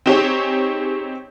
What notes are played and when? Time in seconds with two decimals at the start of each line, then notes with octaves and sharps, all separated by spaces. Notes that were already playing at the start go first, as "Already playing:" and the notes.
0.06 C4 D#4 G4 G#4 C#5